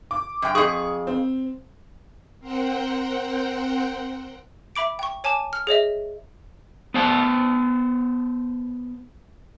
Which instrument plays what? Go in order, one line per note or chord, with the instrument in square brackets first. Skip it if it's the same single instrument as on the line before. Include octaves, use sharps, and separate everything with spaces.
[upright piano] D6
[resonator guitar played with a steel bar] F#2 G5
[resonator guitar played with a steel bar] F2 G#4 [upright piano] C#6 D#6
[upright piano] C4
[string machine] C4 A#4 C5 F#5 G5
[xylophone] E5 B5 D6 D7
G5 C#6
C#5 G#5 A5 D6 E7
F6
G#4 C#5 D#5 E5
[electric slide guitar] B3 C5 G#5 A5